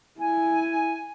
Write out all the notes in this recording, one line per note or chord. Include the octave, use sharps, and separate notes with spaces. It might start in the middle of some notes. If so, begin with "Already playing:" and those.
E4 G#5